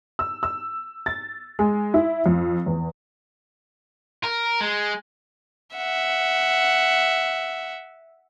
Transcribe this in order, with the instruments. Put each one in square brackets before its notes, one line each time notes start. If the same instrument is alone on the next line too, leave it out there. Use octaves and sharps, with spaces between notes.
[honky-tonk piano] E6
E6
A6
G#3
E4
F2
E2
[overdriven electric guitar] A#4
G#3
[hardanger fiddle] E5 F#5